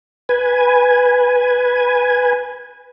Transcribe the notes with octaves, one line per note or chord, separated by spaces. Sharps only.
B4 G#5